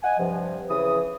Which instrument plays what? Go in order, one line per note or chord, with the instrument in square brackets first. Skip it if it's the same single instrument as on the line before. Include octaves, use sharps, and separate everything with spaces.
[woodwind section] D#5 F#5 G#5
G2 C3 F3
C#3 E3 D#6